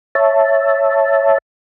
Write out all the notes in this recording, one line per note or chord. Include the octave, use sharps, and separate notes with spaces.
C#5 E5 A5